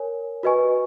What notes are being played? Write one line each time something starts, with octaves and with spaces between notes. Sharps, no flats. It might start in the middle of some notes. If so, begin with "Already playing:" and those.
Already playing: A#4 C#5 G#5
F#4 B4 D#5 G#5 C#6